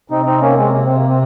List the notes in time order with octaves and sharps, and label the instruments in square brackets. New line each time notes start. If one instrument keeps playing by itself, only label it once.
[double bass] C3 [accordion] C4 D#4
[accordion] C4 D#4
A#3 C#4
G#3 C4
A#3
C4
A#3
C4